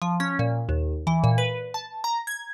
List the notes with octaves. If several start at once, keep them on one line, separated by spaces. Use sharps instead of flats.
F3
C#4
A#2
D#2
E3
A#2
B4
A5
A#5
G#6